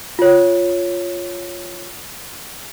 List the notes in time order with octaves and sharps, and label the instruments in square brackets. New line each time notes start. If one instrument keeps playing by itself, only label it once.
[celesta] F4 C#5